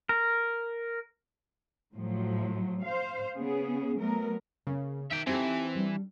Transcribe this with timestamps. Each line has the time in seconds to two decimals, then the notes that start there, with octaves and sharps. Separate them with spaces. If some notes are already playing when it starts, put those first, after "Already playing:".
0.09 A#4
1.94 A2 F3 F#3
2.83 C5 F5
3.36 C#3 B3 C#4 G#4
3.96 F#3 A3 B3 A#4
4.67 C#3 A#3 C#4
5.11 D#3 E5 G5
5.27 E3 C4 D#4 G4 A4
5.75 G3 D4